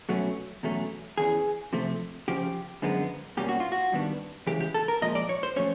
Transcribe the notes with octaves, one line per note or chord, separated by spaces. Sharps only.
B2 F#3 A3 C#4
E2 B2 F#3 A3 C#4
E2 C#3 E3 G#4
C3 F3 A3
F2 C#3 F3 G4
F#2 D3 F3 G#3 B3
B2 G3 A#3 C#4 G4
F#4
F4
F#4
G2 D#3 G3 B3 D4
C#3 E3 G#3 G4
G4
A4
A#4
A#2 F3 G#3 D#5
D5
C#5
C5
F3 A3 C#4 C#5